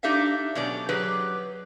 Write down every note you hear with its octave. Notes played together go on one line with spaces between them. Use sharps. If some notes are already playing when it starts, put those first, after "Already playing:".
D4 D#4 G4 A4 E5 F5
B2 F#3 C#4 D5
F#3 G4 G#4 B4